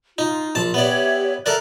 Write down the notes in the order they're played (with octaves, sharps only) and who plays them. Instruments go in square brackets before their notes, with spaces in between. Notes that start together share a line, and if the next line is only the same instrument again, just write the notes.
[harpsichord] D#4 [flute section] F4
[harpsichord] A#1 A5 [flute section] C6
[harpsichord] B3 D5 [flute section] G4 C#5 E5
[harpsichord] A4 A#4 D5 [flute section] E5 F#6